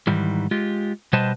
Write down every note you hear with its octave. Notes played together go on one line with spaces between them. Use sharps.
G#2 D#3 E3 G3
G#3 F4 G4
B2 G3 B4 C5 D#5 A5